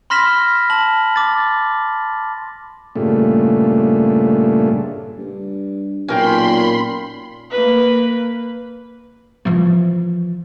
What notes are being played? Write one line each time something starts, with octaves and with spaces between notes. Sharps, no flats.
B5 C6 F6 A#6 B6 E7
A5 F#7
D6 A6
G2 A#2 C#3 A3
G2
B1 A#2 C#4 A#4 G5 B5 C6
A#3 B4
E3 F3